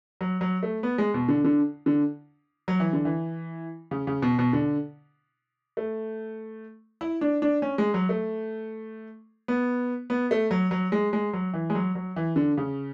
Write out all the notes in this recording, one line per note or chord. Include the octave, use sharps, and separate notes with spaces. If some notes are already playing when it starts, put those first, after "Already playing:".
F#3
F#3
A3
B3
G#3
B2
D3
D3
D3
F#3
E3
D3
E3
C#3
C#3
B2
B2
D3
A3
E4
D4
D4
C#4
G#3
F#3
A3
B3
B3
A3
F#3
F#3
G#3
G#3
F#3
E3
G#3
F#3
F#3
E3
D3
C#3